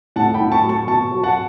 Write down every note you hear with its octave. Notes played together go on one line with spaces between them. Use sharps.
A2 F#5 A5
G5 B5
A2
A5 C#6
F#3
A5 C#6
B2 A5 C#6
F#3
F#5 A5